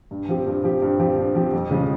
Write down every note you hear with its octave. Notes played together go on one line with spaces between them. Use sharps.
G2
F3 C4 G4
G2
F3 C4 G4
G2
F3 C4 G4
G2
F3 C4 G4
F2
C#3 F3 G#3